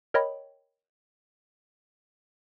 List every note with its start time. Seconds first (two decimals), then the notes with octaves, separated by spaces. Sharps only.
0.14 A#4 C#5 D#5 G5 B5